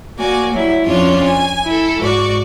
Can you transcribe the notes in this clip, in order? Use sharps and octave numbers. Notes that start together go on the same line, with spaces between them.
A#3 F#4 D5 G#5
F#3 G3 E4
F2 C#4 D4 F4 C#5 C6
G#5
E4 A4
G#2 F#4 D5 C#6